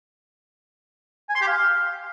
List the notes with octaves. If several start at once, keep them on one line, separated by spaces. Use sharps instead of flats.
G#5
C6
G4
F5